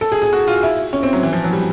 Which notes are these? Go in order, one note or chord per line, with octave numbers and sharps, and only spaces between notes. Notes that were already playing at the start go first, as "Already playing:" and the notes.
A4
G#4
G#4
F#4
F4
E4
C#4
C4
F#3
E3
F3
F#3
G3